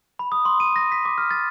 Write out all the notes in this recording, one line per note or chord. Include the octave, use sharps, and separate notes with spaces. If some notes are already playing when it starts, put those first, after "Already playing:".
B5
D#6
C6
D#7
A#6
B6
D6
F6
A6